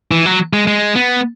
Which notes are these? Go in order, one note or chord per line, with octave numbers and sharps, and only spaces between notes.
E3
F#3
G#3
G#3
B3